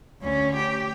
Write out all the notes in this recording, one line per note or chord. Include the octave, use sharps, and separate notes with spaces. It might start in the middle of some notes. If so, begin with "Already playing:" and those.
D2 C#4
G4